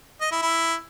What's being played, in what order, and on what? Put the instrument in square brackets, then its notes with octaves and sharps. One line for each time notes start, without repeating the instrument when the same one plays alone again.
[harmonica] D#5
E4
E4